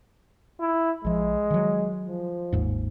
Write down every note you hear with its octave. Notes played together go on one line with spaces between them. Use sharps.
E4
A#1 F3 G#3
D#3 F#3
F3
G1 D#2 G#2